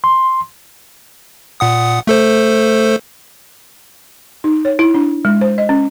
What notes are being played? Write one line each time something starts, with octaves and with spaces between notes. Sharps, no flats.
C6
A#2 F#5 D#6
A3 A4 C5
D#4
C#5
E4
D4
G#3
C5
D#5
C#4